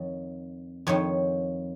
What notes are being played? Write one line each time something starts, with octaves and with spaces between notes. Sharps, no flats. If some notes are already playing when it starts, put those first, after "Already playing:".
Already playing: F2 D#3 C#5
F2 D#3 C#5